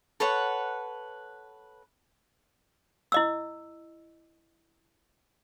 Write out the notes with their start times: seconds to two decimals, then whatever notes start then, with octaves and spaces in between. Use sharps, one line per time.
0.20 A4 B4 C#5 F#5
3.12 E4 D#5 E6